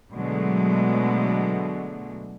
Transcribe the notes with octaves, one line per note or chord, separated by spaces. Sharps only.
B2 D3 F#3 G#3 A3